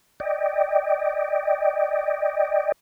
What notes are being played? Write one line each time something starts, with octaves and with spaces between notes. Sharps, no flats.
D5 D#5 G5